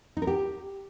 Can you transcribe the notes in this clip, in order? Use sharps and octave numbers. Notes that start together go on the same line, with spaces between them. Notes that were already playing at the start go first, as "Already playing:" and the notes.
D#4
A#4
G4